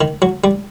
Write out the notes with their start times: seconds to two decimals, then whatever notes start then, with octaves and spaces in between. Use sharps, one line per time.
0.01 D#3
0.22 F#3
0.44 G3